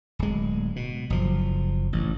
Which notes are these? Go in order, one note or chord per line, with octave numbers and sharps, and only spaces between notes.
D1 G#3
B2
F#1 F3
A1